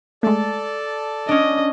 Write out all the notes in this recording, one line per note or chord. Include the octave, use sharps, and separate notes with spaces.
G#3 A3 A4 D5 A5
C#4 D4 D#5